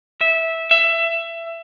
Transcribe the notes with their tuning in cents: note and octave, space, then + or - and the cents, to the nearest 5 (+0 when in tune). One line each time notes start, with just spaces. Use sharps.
E5 -10
E5 +20